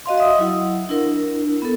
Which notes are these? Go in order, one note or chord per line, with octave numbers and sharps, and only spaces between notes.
F#4 D#5 F5 C6
D#5 E5 D#6
F#3 E4 F#5
D4 E4 A#4
B3 A4